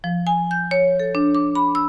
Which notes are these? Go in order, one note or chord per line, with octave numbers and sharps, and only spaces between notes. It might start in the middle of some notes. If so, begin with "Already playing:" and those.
F3
G#5
G6
C#5
A4
D4
D6
B5
E6